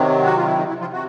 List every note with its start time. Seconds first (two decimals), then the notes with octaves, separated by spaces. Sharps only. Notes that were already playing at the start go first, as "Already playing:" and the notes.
Already playing: C3 D#3 F#3
0.26 F#4
0.36 F4
0.46 E4
0.57 D#4
0.69 E4
0.81 F3 F4
0.93 C3 F#4